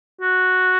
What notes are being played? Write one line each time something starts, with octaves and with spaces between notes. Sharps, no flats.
F#4